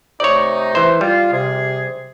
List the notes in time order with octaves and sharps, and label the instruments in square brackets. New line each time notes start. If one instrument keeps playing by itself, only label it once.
[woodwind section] C3 A3 D#4 [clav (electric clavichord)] C#5 D5
[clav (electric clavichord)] E3 C5
[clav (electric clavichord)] G3 [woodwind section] F4
[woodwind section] C3 G#4